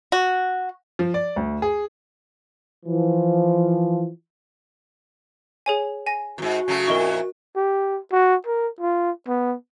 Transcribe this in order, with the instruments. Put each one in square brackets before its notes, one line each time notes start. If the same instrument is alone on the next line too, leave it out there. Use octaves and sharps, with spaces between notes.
[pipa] F#4
[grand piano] F3
D5
D2
G#4
[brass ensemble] E3 F3
[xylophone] G#4 C#5 G#5
G#5 A#6
[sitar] E2 G#2 [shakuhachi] F#4
[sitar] C#3 F#3 A3
[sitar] F2 A#2 E4 [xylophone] A#4 D#5 C#6
[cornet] G4
F#4
A#4
F4
B3